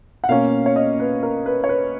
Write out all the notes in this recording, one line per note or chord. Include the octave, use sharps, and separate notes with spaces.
F#5
B2 A#3 C#4 F5
C#5
D#5
B4
A#4
B4
C#5
B4